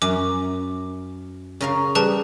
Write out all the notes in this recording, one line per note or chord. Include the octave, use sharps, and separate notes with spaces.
F#2 D6
C#3 A#4 F5
G3 G#4 B4 A5